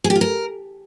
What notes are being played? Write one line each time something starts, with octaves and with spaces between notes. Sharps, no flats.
G#4
G4
F4
A#4